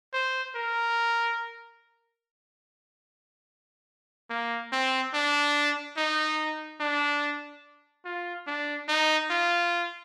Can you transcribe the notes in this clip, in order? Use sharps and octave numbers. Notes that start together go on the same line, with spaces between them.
C5
A#4
A#3
C4
D4
D#4
D4
F4
D4
D#4
F4